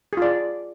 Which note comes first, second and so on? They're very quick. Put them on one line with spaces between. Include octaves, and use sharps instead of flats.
G#4 F4 D5